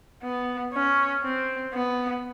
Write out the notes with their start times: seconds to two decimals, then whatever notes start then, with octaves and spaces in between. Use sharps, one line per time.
0.23 B3
0.73 C#4
1.24 C4
1.74 B3